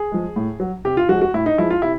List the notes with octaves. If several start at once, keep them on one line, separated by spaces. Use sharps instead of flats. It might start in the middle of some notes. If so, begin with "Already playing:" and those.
Already playing: G#4
F3 G#3
A2
F#3
C3 G4
F4
F3 G#3 F#4
F#4
A2 E4
D#4
F3 G#3 E4
F4
C3 E4